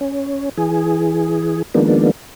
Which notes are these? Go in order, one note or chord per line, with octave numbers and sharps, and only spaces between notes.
C#4
E3 G#4
D#3 F3 G#3 A#3 B3 D4